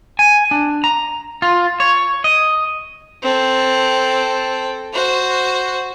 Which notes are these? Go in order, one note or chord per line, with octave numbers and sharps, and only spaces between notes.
G#5
D4
A#5
F4
C#5
D#5
C4 A4
F#4 C5